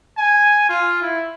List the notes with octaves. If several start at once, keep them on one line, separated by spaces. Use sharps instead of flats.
G#5
F4
E4